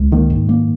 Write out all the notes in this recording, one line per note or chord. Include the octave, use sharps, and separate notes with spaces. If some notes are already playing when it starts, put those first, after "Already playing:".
Already playing: C#2
D#3 A#3
G#2
A#3